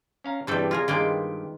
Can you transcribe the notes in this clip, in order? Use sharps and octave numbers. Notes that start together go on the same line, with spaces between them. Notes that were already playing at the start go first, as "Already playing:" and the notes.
C#4 F5 A#5
G2 C3 E3 G3 A4 C#5 D5 G5
F4 G#4 A#4
G2 D#3 G#3 A#3 F4 B4 D5 G5